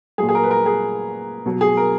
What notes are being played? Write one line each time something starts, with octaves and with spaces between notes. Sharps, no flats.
A#2 F#3 G#4
G#4
A#4
B4
A#4
G#4
B2 F#3
G#4
A#4